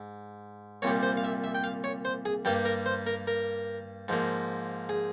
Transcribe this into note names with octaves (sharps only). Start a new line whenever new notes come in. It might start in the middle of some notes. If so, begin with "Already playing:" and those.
Already playing: G#2
C2 A#2 G3 C#5
C5
F5
E5
E5
G5
F5
C#5
C5
G#4
G2 G3 A#3 G4
A#4
C5
A#4
A#4
G#2 F3 A#3
G#4